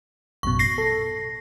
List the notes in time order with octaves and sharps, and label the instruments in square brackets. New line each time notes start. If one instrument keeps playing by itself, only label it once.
[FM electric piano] A1 F#2 B2 [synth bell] C#6
[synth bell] A#6 C7
[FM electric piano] A4